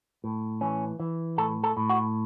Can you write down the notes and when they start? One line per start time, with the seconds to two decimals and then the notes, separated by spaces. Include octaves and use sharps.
0.24 A2
0.61 E3 C#4
1.00 E3
1.38 A2 A4
1.64 A4
1.77 A2
1.90 F#4